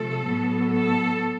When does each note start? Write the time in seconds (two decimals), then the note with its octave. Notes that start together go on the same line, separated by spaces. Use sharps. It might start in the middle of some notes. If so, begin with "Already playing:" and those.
Already playing: C3 F3 A3 A4
0.25 A2 F#3 B3
0.71 A4